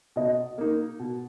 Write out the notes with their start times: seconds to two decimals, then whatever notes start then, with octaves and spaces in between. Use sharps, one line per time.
0.16 B2 D#5
0.58 A#3 D#4
0.99 B2